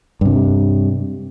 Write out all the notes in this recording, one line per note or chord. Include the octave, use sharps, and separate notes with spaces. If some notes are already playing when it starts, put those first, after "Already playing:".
G2 C3